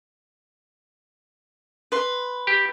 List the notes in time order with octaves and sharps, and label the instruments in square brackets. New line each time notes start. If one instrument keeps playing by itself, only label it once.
[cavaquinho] B4 C6
[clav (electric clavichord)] G4